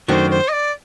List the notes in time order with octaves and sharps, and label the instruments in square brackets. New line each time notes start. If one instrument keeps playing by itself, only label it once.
[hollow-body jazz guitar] F#2 D#3 A3 D4 F#4 [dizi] C5
[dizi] C5
D#5
D5